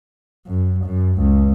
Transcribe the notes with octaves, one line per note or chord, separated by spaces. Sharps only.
F#2
F#2
C#2